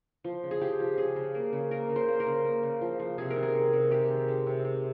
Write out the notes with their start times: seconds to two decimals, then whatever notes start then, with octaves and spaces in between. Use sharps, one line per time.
0.24 F3
0.43 C#3
0.51 G#4
0.61 F3 G4
0.80 F3
0.98 C#3 G#4
1.16 C#3
1.35 A#3
1.53 C#3
1.71 A#3 A#4
1.89 C#3
1.96 C5
2.08 A#3
2.20 A#4
2.26 C#3
2.45 A#3
2.63 C#3
2.81 F3
3.00 F3
3.18 C3 G#4
3.30 A#4
3.36 D#3
3.43 G#4
3.55 C3
3.73 C3
3.91 G#3 G4
4.10 D#3
4.28 G#3
4.46 C3
4.65 C3